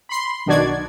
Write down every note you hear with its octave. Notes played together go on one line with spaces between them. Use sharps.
B5 C6
B1 D#3 D4 F#4 D5 G#6